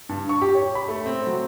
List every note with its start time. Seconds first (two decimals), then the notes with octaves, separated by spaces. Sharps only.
0.09 G2
0.29 C#6
0.41 G4
0.55 C#5
0.75 B5
0.88 A3
1.06 C4
1.27 F#3